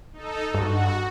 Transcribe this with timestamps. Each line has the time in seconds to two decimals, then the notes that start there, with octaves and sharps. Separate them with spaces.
0.12 D#4 A4
0.54 G2 F#4